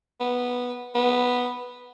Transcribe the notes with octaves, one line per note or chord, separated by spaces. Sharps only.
B3
B3